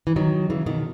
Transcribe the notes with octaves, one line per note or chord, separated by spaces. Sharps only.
E3
D#3 F#3
C#3 E3
B2 D#3